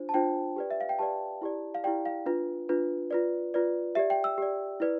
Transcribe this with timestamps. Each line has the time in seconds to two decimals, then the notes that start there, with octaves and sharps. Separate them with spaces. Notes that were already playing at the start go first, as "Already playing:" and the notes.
Already playing: D4 F4 C5
0.09 A5
0.14 D4 F4 C5 G5
0.56 G4 B4 D5
0.71 E5
0.81 F5
0.89 G5
0.99 G4 B4 D5 A5
1.41 E4 G4 D5
1.74 F5
1.84 E4 G4 D5 G5
2.05 F5
2.26 D4 F4 B4
2.69 D4 F4 B4
3.11 F4 B4 D5
3.54 F4 B4 D5
3.95 G4 D5 E5
4.10 G5
4.24 E6
4.38 G4 D5
4.80 E4 B4 D5